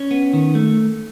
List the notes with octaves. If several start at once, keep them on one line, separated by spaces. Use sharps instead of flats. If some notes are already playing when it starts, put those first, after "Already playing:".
Already playing: C#4 C#5
B3
D#3
A3